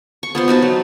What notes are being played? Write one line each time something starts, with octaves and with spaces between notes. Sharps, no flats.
C#6
B3 F4 C5
D#4 F#4 B4 A5
F#3